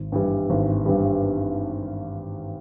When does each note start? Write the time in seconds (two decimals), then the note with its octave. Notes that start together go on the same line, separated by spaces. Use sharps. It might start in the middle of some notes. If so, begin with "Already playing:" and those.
Already playing: G#1
0.12 G2 E3 G3
0.50 G#1
0.86 G2 E3 G3